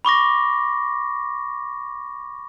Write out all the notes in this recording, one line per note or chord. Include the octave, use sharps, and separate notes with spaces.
B5 C#6 D6 A#6